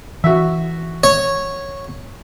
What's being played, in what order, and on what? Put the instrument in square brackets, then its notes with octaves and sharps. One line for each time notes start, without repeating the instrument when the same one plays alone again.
[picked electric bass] E3 [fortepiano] F#4 E5
[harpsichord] C#5